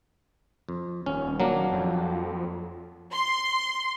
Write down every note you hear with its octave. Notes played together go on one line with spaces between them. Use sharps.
F2
D#1 C#4
F#3 A#3 D4
F2
C6